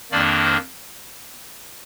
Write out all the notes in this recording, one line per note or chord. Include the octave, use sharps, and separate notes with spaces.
F2 D#3 A#3 D4 D5
C5